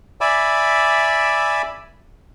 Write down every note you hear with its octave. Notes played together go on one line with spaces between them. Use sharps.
D5 E5 G#5 B5 D6 E6